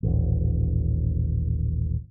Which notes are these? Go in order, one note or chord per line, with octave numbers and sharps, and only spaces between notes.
D#1 A1